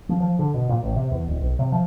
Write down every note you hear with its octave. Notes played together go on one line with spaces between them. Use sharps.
F3
F3
D3
B2
A#2
A1
C3
E2
D1
B1
C3
F3